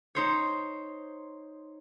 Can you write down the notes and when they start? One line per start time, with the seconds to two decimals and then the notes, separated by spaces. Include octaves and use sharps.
0.15 D#4 C5 C#5